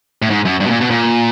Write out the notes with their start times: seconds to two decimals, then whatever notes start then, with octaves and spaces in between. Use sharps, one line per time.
0.22 A2
0.30 G#2
0.45 F#2
0.60 G2
0.66 B2
0.70 A#2
0.81 B2
0.91 A#2